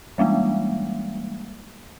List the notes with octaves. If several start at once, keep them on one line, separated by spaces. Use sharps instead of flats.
E3 G3 G#3 A#3